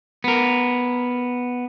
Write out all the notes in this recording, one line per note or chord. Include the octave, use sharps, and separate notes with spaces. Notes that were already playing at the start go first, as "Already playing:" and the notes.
B3 A#4